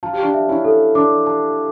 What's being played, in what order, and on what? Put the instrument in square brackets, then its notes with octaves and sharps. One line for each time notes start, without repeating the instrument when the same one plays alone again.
[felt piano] F4 [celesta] A5
[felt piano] G4
D4 F4
[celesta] E5
[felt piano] C#4 E4
[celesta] A4
[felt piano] D4 [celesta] D6
[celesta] A5